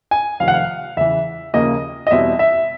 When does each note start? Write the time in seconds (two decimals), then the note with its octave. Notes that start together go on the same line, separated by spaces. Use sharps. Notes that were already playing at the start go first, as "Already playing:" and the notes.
0.11 G#5
0.40 F1 F2 C3 D#3 F5
0.48 F#5
0.54 F5
0.97 E2 C#3 E3 E5
1.54 D#2 C#3 F3 A#3 C#4 D#5
2.07 D#5
2.11 E2 B2 G3 C4 E4 E5
2.39 E5